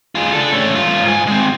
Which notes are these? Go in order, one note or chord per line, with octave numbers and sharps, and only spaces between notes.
F4 G#4
D4 A4
A3 C#4
G2 F4
G#2 G#5
G#3 C4